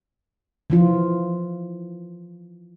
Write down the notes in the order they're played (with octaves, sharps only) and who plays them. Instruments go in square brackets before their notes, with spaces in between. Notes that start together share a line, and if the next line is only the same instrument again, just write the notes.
[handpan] E3 F3 F4